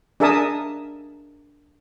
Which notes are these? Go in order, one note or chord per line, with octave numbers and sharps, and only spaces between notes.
D4 G#4 A#4 E5 A5 D#6